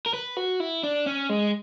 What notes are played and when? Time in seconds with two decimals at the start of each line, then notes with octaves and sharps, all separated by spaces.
0.06 A#4
0.14 B4
0.37 F#4
0.60 E4
0.83 D4
1.06 C#4
1.29 G#3